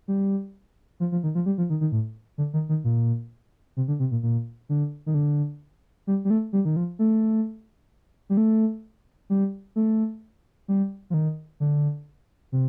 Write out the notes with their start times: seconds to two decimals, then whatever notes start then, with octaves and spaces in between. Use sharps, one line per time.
0.08 G3
1.00 F3
1.12 F3
1.23 D#3
1.35 F3
1.46 G3
1.58 F3
1.70 D#3
1.81 D#3
1.92 A2
2.38 D3
2.54 D#3
2.69 D#3
2.84 A#2
3.77 C3
3.88 D3
4.00 C3
4.11 A#2
4.23 A#2
4.69 D3
5.06 D#3
5.14 D3
6.07 G3
6.25 G3
6.30 A3
6.53 G3
6.65 D#3
6.76 F3
6.99 A3
8.30 G3
8.37 A3
9.30 G3
9.76 A3
10.68 G3
11.10 F3
11.14 D#3
11.60 D3
12.52 C3